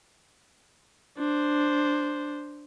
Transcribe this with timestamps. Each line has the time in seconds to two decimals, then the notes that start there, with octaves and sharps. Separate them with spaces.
1.17 D4 C5